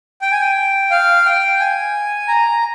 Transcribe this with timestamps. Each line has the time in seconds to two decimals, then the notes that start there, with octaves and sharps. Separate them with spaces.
0.22 G5
0.32 G#5
0.41 G5
0.91 F5
1.26 G5
1.60 G#5
2.28 A#5